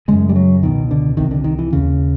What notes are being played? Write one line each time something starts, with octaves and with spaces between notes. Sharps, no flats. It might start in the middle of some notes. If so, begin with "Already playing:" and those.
F#2 C#3 G#3
G3
F#3
C#2 B2 D#3
D3
C2 C3 D#3
D3
D#3
E3
D#2 C#3